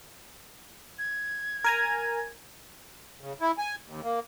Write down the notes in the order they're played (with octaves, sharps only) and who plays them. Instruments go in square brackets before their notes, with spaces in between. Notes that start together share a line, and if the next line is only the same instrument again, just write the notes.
[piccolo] G#6
[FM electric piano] A#4 G#5 A#5
[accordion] C#3
E4
G#5
D#2
A#3